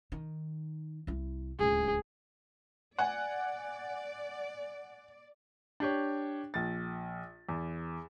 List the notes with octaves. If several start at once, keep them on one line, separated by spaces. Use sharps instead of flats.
D#3
C2 E4
D1 C#2 G#4
D5 F#5 G#5
D4 G4 C#5
A#1 A6
E2